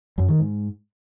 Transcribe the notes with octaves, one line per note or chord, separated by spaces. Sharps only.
F#2
D#3
G#2